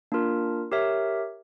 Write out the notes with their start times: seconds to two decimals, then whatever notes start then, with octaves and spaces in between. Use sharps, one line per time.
0.12 A#3 D4 F4 A#4
0.72 G4 A#4 C#5 E5